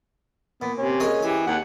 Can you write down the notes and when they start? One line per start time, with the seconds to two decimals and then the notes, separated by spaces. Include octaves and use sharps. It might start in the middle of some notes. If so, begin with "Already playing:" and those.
0.62 A#2 B3
0.78 C3 C#4
1.00 A#3 G#4 C#5 D#5
1.22 E3 G4 G#4
1.47 D#2 D#4 F#5